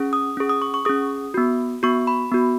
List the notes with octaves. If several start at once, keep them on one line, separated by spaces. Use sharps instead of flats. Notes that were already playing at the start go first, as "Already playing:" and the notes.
Already playing: C#4 G#4
D#6
C#4 G#4
D#6
C#6
C#6
C#4 G#4 D#6
B3 F#4
B3 F#4 C#6
B5
B3 F#4